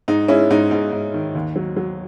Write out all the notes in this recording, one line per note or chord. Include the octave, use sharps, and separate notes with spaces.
G#2 D#4
G#3 C#4 E4
G#2 D#4
G#2 D#4
G#2
D#3
D#2
F#3
F#3